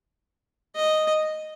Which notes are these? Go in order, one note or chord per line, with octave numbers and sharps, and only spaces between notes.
D#5